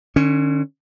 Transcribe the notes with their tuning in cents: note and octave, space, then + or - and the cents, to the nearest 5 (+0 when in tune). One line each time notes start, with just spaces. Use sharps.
D3 +40 C#4 +0